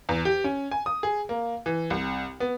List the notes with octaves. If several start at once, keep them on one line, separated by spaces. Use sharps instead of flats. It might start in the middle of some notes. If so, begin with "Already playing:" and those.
E2
G4
C#4
G#5
D#6
G#4
A#3
E3
C2
B3